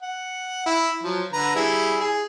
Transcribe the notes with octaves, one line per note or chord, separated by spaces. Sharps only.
F#5
E4
F3 F#3
D3 B4 A#5
G3 E4 G#4
G#4